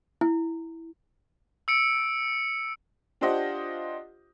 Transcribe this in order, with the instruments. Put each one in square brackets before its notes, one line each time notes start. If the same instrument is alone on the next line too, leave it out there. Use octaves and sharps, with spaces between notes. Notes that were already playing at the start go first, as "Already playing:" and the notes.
[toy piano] E4
[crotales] E6 C#7 D7
[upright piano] D4 F4 G4 C5 D#5 F#5